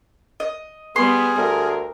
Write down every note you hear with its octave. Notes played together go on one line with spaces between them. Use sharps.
D#5
G3 B3 G#4 C6
D2 A#4